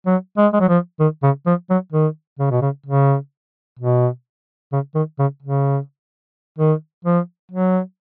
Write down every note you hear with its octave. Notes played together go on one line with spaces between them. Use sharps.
F#3
G#3
G#3
F#3
F3
D#3
C#3
F3
F#3
D#3
C#3
B2
C#3
C#3
B2
C#3
D#3
C#3
C#3
D#3
F3
F#3